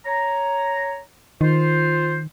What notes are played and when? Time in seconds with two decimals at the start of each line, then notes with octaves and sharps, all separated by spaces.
0.05 C#5 A#5
1.41 D#3 F4 C5